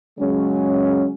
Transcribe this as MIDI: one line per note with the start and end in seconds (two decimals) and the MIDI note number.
0.19 1.13 49
0.19 1.13 54
0.19 1.13 56
0.19 1.13 61